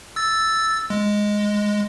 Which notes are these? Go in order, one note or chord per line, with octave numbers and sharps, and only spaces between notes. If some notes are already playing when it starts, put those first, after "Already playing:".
E6 A6
G#3